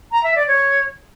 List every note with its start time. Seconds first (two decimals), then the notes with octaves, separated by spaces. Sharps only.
0.12 A#5
0.24 E5
0.36 D5
0.48 C#5